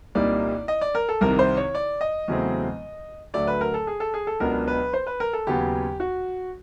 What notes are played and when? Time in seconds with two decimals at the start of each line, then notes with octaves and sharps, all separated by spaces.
0.15 C2 A#2 G3 A#3 D#4 D5
0.68 D#5
0.81 D5
0.95 A#4
1.09 A4
1.21 C2 C3 D#3 A#4
1.39 C5
1.57 C#5
1.75 D5
2.01 D#5
2.28 E2 C#3 F#3 A3 C4
3.34 D2 D3 F#3 A3 D5
3.47 B4
3.61 A#4
3.74 A4
3.87 G#4
4.00 A4
4.14 G#4
4.27 A4
4.40 C#2 B2 F#3 B3 D4 A#4
4.68 B4
4.93 C5
5.07 B4
5.20 A#4
5.33 A4
5.47 D#2 C#3 F#3 B3 G4
6.00 F#4